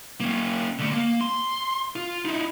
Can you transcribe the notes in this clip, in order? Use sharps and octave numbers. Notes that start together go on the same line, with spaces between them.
A#3 C#4
D3 A3
A#3
C6
F4
D#4 E4